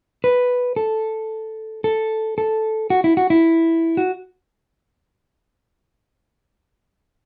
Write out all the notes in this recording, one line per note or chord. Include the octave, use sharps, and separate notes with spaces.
B4
A4
A4
A4
F#4
E4
F#4
E4
F#4